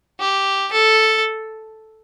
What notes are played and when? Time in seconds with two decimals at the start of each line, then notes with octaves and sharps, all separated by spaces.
0.20 G4
0.72 A4